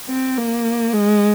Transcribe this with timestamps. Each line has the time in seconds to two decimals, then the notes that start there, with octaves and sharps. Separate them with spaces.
0.09 C4
0.37 A#3
0.93 G#3